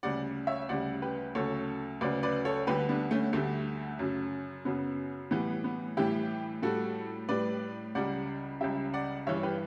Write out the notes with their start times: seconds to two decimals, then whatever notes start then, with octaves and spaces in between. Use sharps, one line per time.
0.03 D2 C#3 G3 D5 F#5
0.47 C#5 E5
0.69 D2 C#3 G3 D5 F#5
1.02 G4 B4
1.35 D2 C#3 F#3 A4 C#5
2.01 D2 C#3 F#3 B4 D5
2.23 B4 D5
2.45 A4 C#5
2.67 D2 D3 G3 G4 B4
2.89 B3 D4
3.11 A3 C#4
3.33 D2 D3 G3 A3
3.99 F#2 C#3 F#3
4.65 F#2 C#3 F#3 B3
5.31 A2 E3 G3 B3
5.64 B3
5.97 A2 E3 G3 E4 G4
6.63 A2 G3 F#4 A4
7.29 A2 G3 B4 D5
7.95 C#2 C#3 G3 D5 F#5
8.61 C#2 C#3 G3 E5 G5
8.94 D5 F#5
9.27 G2 E3 G3 C#5 E5
9.43 G4 B4